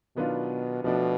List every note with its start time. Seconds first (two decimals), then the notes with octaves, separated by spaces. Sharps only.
0.16 B2 D#3 F#3 B3 D4 F4
0.84 B2 F3 A3 D4 F#4